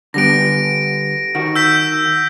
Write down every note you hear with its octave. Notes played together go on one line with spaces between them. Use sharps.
D3 G3 B3 A#6 D7
D#3 F#4
E6 G6 B6